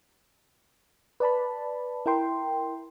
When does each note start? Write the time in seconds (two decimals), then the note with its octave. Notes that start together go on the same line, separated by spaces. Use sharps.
1.20 B4 D5 A5 B5
2.06 E4 A#4 G5 C6